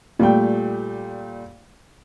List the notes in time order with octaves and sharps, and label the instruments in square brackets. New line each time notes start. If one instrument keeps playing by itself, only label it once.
[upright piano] A#2 G3 A3 G5